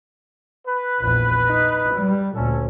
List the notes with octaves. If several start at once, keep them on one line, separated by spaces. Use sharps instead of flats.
B4
A#1 E2
D#4
G3
D2 A#2 C#4 A4